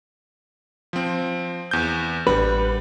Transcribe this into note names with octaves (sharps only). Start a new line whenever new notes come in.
F3 C4
E2 G6
A1 G3 D4 B4 F#5